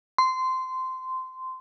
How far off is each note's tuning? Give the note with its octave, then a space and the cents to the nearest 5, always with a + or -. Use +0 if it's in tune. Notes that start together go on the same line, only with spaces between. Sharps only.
C6 -15